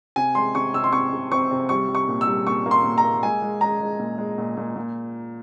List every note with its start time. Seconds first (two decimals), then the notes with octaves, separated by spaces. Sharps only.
0.16 C3 G#5
0.35 G#3 C6
0.55 C3 C#6
0.74 C3 E6
0.84 C6
0.93 C3 C#6
1.13 C3
1.32 C4 C#6
1.51 C3
1.69 G3 C#6
1.88 G3
1.95 C#6
2.08 A#2
2.21 E6
2.27 G3
2.47 A#2 C#6
2.66 A#3
2.71 C6
2.84 A#2
2.98 A#5
3.04 A#3
3.23 G#3 G#5
3.42 G#3
3.61 G#3 A#5
3.80 G#3
3.99 A#2
4.18 G#3
4.38 A#2
4.57 A#2
4.76 A#2